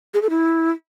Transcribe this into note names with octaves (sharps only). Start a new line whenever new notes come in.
G#4
A4
E4